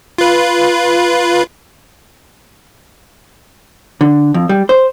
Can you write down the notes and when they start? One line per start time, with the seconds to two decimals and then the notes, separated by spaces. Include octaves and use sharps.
0.18 F4 B4
4.01 D3
4.34 F2
4.49 G3
4.69 C5